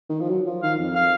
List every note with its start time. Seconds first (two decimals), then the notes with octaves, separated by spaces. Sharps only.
0.10 D#3
0.21 F3
0.30 F#3
0.47 F3
0.63 D#3 F5
0.79 F2
0.95 F5